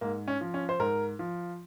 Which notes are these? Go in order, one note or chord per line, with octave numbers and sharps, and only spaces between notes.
G#2 A#3
C#4
F3
C#4
C5
G#2 A#4
F3